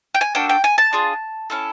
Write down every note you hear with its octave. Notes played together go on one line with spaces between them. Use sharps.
G5
G#5
A#3 D4 F#4 A4 G5
G5
G#5
A5
D4 F4 G#4
C#4 E4 A4